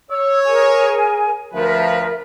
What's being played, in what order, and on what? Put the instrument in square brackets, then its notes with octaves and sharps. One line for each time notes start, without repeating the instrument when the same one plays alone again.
[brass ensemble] C#5 [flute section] E6
[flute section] G#4 A#4 G#5
[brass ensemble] D2 F3 B4 [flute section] A#4 E5